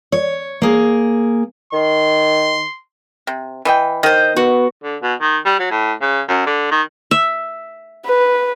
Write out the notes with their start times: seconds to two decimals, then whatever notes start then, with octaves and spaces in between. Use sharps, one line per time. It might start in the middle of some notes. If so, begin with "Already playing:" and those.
0.12 C#5
0.62 A#3 G#4
1.73 D#3 C6
3.27 C3
3.65 E3 D#5 G5
4.03 D#3 C5 D#5
4.36 B3 F#4
4.83 D3
5.03 B2
5.21 D#3
5.45 G3
5.59 F#3
5.71 A2
6.02 C#3
6.28 F#2
6.46 D3
6.71 D#3
7.11 E5
8.06 B4